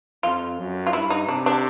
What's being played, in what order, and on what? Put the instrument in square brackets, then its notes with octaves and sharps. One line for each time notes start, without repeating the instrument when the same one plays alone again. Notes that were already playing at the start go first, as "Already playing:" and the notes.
[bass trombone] F2 [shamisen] F4
[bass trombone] F#2
[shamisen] F4
[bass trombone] G2 [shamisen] E4
[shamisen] D#4
[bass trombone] C3 [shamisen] D4
[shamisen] D4